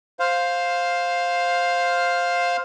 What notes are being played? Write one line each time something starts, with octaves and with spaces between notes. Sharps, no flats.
C5 F5